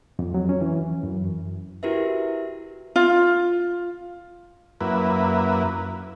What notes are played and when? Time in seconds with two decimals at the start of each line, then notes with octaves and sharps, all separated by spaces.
0.19 F2
0.34 F#3
0.49 C#4
0.61 E3
1.03 F#2
1.83 E4 F#4 G4 A#4 B4 E5
2.96 F4
4.81 F#2 A#3 E4 B4